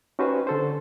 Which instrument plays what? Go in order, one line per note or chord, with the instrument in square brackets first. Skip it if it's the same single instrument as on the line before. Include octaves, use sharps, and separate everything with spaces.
[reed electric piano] C#4 D#4 F#4 G4 B4 C5
D3 A4 C5